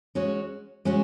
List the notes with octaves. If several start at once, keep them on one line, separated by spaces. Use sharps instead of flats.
G#3 C#4 F#4 C#5
G#3 C#4 F#4 C#5